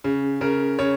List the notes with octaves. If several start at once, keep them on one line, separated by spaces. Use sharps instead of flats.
C#3
C#3 A#4
C#3 C#5